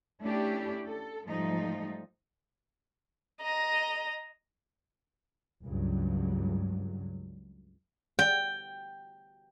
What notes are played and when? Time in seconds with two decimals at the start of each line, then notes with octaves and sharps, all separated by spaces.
0.22 A3 C#4 D4 E4 G4
0.88 A4
1.27 G#2 F3 G3 A3 D#4
3.42 D#5 A#5
5.63 C#2 G2 F#3
8.19 G5